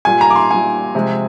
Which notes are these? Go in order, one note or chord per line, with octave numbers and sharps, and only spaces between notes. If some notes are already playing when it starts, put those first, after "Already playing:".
A#2 G3 G#5
A#5
D6
C6
A#2 G3 G#5
C3 F3 G#3